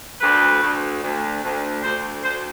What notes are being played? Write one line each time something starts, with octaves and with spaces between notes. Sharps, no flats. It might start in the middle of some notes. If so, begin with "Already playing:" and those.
D2 B4
D2
D2
D2
D2 C5
D2 C5